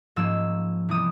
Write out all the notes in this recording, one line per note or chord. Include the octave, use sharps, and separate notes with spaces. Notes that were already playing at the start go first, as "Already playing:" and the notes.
G#2 F3 A#3 C#4 E6
C3 E3 G3 B3 D#6